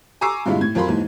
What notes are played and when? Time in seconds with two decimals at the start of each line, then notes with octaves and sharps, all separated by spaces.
0.21 G#5 A#5 C#6 D6 E6 C7
0.46 G2 A#2 D3 G#3 E4 F4
0.61 A2 G#6
0.75 F2 F#3 F4 A#4 B5 C6
0.88 D#2 G#2 E3